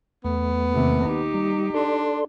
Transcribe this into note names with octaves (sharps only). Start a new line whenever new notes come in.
E2 A3 B3
D#2 C3
D#4 G4
G3
D4 A4 D5 C6